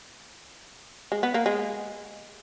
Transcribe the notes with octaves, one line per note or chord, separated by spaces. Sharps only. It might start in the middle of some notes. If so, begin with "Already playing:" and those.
G#3
B3
A#3
G#3